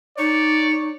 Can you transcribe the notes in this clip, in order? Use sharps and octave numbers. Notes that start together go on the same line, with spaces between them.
D#4 C#5 D5